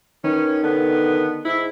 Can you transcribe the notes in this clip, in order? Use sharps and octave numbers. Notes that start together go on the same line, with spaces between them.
D#3 C#4 B4
D3 B3
G#2 E4